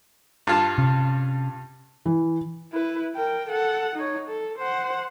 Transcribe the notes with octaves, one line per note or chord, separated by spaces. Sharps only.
G2 F4 A5
C3 C#4
E3
E4 B4
A#4 G5
A4 F#5
D#4 C#5
A4
C5 F#5